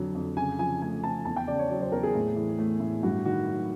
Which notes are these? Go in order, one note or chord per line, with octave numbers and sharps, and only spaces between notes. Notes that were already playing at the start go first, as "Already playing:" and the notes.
Already playing: F2 D3 F#3
F2
C#3 G#5
F3 G#5
A3 G#5
C4 A5
E2 A5
G5
C#3 D5
C#5
F#3 C#5
C5
E2 A#4
G#4
A2
E3
A3
A2
G2 F#4
D#3 F#4
F#3